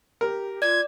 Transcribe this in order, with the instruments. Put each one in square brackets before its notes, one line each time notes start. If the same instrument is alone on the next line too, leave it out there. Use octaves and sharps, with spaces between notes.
[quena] G4 [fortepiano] A#4
[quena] F4 [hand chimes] D5 [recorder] G#6